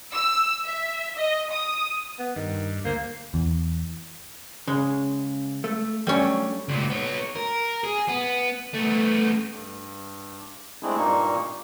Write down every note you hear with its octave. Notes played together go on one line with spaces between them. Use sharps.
E6
E5
D#5
D#6
B3
G2 D#3
D2 A#3 C5
E2
C#3 G#3
A3
F#2 G3 A3 C#4 D4
C#2 A#2
B3 C#5
A#4
G#4
B3
A3 B3
G2
G#3 A3 C4 D4 E4 G#4
G2 A#2 G3 A#3 D#4 C#6